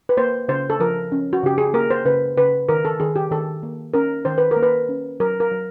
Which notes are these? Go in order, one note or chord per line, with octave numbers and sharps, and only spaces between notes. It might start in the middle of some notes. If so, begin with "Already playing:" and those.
B4
A#3 C5
C#3 C5
A4
F3 A#4
C#4
F#4
C#3 G4
G#4
A#3 A#4
C5
C#3 B4
C#3 B4
D#3 A#4
A4
D#3 G#4
G4
D#3 A4
A#3
C#4 A#4
D#3 C5
B4
A#4
A#3
B4
C#4
F#3 A#4
A#4
F#3